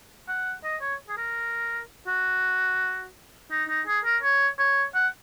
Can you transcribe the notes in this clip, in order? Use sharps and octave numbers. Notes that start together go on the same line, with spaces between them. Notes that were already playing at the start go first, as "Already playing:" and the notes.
F#5
D#5
C#5
G#4
A#4
F#4
D#4
D#4
G#4
A#4
C#5
C#5
F#5